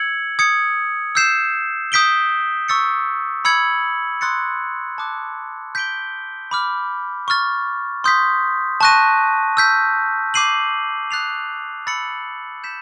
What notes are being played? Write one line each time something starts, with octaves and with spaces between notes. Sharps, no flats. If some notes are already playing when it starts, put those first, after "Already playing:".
Already playing: E6 G#6 C#7 F#7
D#6 G#6 C#7
E6 G6 C7 E7
D#6 G6 B6 D7 G7
C#6 E6 A6 C#7
B5 E6 G#6 C#7 F#7
C6 D#6 F#6 A6 C#7
A5 D6 F#6
G6 B6 D7 G7
B5 D6 F6
C#6 F6 A6
C6 D#6 G6 B6
A5 C#6 F#6 A#6 D#7
E6 G6 B6
D6 G6 C7 D#7 F#7
D#6 F#6 A6 C7 F7
B5 E6 A6 C#7 F#7
G6 B6 E7